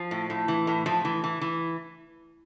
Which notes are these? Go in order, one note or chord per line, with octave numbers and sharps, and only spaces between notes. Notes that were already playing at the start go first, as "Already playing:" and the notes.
Already playing: F3
A2
A2
E3
A2
A2 F3
E3
E3
E3